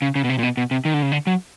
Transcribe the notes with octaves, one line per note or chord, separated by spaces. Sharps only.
C#3
C#3
B2
C3
A#2
B2
B2
C3
D#3
D3
C#3
D3
F#3